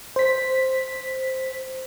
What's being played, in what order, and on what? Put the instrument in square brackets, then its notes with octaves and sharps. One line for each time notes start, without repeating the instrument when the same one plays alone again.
[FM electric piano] C5 B6